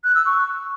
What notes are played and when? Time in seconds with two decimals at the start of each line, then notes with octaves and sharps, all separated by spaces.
0.04 F#6
0.15 E6
0.26 C#6